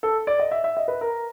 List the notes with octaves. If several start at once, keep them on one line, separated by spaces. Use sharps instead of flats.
A4
D5
D#5
E5
E5
D#5
B4
A#4